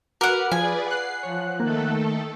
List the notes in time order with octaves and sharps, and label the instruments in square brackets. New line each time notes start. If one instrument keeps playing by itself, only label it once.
[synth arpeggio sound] F#4 [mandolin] A#4 F#5 [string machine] B4 [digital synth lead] D6
[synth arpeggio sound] F3 [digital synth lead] F4 [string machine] G#4 B4 D5 [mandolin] G#5
[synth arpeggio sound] F#5 F#6 [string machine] C7
[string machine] F3 [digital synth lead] C#5
[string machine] D#3 A3 A4 [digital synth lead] A#3